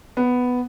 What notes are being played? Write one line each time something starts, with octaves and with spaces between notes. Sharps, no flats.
B3